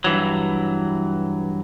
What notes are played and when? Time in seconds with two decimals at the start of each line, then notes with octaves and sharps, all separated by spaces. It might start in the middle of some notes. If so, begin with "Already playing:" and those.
0.04 G2 E3 F#3